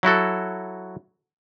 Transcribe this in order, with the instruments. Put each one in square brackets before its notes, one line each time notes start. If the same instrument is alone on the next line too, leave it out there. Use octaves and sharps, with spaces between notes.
[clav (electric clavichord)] F#3 E4 F#4 A4